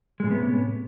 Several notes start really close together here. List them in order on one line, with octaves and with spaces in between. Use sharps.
G#3 A2 C3 B3 C#4